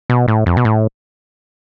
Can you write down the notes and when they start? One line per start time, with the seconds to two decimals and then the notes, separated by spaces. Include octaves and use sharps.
0.10 B2
0.28 A2
0.46 F2
0.57 B2
0.65 A2